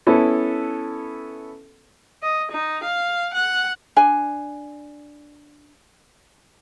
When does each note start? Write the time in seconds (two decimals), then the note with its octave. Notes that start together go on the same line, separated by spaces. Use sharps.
0.07 B3 C#4 E4 A4
2.23 D#5
2.52 D#4
2.84 F5
3.34 F#5
3.96 D4 G#5